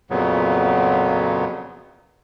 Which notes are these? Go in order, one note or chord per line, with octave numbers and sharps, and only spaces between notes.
F2 A#2 C#3 F#3 B3